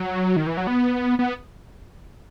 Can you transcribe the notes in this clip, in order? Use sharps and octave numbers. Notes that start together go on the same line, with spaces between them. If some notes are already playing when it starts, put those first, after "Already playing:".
Already playing: F#3
D#3
E3
F#3
B3
B3